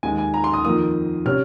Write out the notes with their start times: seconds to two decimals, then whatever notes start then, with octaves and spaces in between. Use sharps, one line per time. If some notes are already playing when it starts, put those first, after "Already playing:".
0.03 D#2 D#3 G#3 G#5
0.18 G#5
0.34 A#5
0.44 C6
0.54 D#6
0.64 F2 D#3 A#3 F4 D#6
1.25 C3 G3 C#4 F6